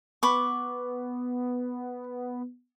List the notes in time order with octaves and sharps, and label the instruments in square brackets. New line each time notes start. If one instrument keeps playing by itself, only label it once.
[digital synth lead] B3 [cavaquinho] B5 C#6 D6